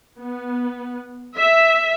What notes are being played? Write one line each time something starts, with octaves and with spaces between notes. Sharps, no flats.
B3
E5